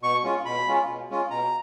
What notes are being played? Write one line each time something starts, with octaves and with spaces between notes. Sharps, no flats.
B2 C#6
G#3 C#4 F4
B2 B5
G#3 C#4 F4
B2
G#3 C#4 F4
B2 A#5